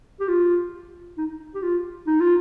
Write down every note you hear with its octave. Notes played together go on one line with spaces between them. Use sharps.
G4
F4
D#4
G4
F4
D#4
F4